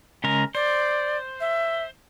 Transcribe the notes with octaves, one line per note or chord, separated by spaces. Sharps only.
C#3 G#3 A#4
C5 D5
E5